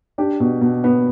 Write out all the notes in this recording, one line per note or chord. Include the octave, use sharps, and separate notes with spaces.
D4 G4
B2
B2
B3